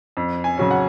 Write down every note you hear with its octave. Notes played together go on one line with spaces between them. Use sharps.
F2
G#5
C#3 F#3 C#4
F#5